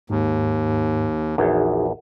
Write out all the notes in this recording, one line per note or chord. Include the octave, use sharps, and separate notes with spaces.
D#2 G#2
A#1 E2 D#4 F#4 G#4